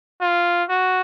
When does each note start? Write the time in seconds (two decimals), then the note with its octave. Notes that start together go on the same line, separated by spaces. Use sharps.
0.21 F4
0.69 F#4